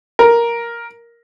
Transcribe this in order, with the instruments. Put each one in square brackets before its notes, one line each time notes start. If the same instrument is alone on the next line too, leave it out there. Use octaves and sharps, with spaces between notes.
[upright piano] A#4